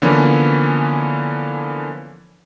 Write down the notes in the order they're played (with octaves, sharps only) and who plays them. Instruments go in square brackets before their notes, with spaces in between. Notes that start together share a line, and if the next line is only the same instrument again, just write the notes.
[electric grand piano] D3 E3 F3 A#3 B3 C#4